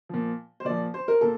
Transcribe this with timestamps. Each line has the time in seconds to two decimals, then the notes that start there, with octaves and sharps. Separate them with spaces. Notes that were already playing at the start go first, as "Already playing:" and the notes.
0.09 A#2 F3
0.60 C5
0.65 A#2 F3 D5
0.94 C5
1.08 A#4
1.21 A#2 A4